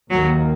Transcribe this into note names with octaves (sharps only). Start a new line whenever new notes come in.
D#2 D#3 F#3 A#3